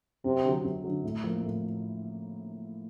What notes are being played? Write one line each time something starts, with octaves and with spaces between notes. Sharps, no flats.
F#2 C3
D3 F#3
F#2
D3 F#3
A2
F3 A#3
A2